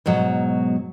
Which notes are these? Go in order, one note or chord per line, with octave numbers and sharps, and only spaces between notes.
G#2 B2 F#3